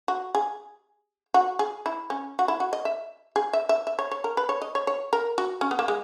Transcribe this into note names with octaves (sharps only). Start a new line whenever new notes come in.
F#4
G#4
F#4
G#4
E4
C#4
F#4
E4
F#4
D#5
E5
G#4
E5
E5
E5
C#5
C#5
A#4
B4
C#5
D#5
C#5
C#5
A#4
F#4
C#4
B3
A#3
G#3